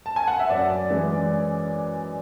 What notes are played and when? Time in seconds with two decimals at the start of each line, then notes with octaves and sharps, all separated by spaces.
0.06 A5
0.16 G#5
0.28 F#5
0.39 E5
0.50 F#2 D5
0.90 E3 G#3